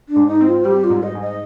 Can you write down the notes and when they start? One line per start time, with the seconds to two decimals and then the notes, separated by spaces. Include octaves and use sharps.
0.09 D4
0.16 G#2
0.27 D#4
0.40 C4
0.46 F4
0.65 G3 G4
0.84 F4
0.90 G#2
1.03 D#5
1.15 G#2
1.21 D#5